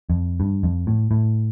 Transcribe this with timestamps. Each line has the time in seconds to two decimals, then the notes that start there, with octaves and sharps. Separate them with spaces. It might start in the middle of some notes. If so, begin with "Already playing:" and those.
0.10 F2
0.40 G2
0.63 F2
0.87 A2
1.11 A2